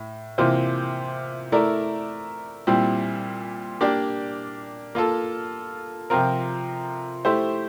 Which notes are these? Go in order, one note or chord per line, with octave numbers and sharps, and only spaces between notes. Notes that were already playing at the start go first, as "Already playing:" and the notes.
Already playing: A2
C3 E3 A#3 F4 C5
A3 E4 A#4 D5
A#2 G3 C4 E4
A#3 D4 G4 D5
A#3 F4 A4
C3 F3 C4 F4 A#4
A3 E4 G4 C5